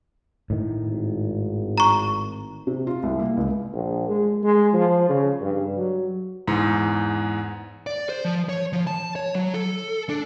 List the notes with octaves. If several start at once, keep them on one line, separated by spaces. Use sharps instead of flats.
A2 D#3
G#1
A#5 C#6
C3
F4
C2
A#3
C#2
A#1
G#3
G#3
F3
C#3
G2
F#3
E2 G#2
D5
C5
F3
C#5
F3
A5
C#5
F#3
A4
D4